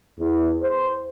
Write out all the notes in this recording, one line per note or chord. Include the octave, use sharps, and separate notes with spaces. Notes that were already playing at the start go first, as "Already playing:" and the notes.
E2
C5